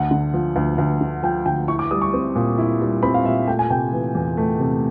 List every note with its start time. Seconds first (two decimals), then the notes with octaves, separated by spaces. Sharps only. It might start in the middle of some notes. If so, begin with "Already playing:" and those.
Already playing: D2 F#5
0.11 D3
0.34 F3
0.56 D2
0.78 D2
1.01 D3
1.23 F3 G5
1.46 D2 G5
1.68 E4 C#6
1.79 D6
1.91 G3 D#6
2.02 C#6
2.14 C4
2.35 A#2
2.58 E4
2.81 G3
3.03 C4 B5
3.14 F5
3.25 A#2 E5
3.47 A3 G5
3.59 G#5
3.70 C3 G5
3.93 E3
4.15 E2
4.37 A3
4.60 C3